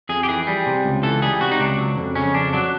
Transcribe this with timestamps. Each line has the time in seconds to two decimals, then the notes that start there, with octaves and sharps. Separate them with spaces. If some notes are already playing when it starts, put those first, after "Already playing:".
0.09 F2 G#4
0.23 G4
0.28 E3 G#4
0.47 G3
0.66 C3
0.84 C#2
1.03 E3 A4
1.22 G3 G#4
1.41 C3 F#4
1.51 D#4
1.60 C#2 D4
1.78 F#3
1.98 F2
2.15 C#3 C#4
2.34 F2 D4
2.53 F#3 D4